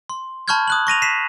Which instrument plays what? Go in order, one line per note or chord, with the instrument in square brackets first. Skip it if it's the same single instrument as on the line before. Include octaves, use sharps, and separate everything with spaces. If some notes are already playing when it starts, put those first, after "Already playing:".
[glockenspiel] C6
A5 B5 C#6 F6 G6 G#6
D#6 F#6 F#7
C#6 A#6 D#7 F7
B6 C7 E7